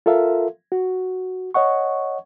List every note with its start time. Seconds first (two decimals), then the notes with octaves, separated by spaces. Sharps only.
0.06 F4 A4 A#4 E5 F5
0.72 F#4
1.54 C#5 D#5 F#5 C#6